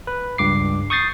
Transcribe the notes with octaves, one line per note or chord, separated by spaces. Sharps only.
B4
C#2 G2 D6 C7
C#6 D#6 G6 A6 C7